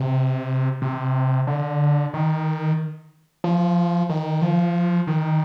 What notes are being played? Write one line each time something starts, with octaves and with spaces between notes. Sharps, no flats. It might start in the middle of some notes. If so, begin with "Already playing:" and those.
Already playing: C3
C3
D3
D#3
F3
D#3
F3
D#3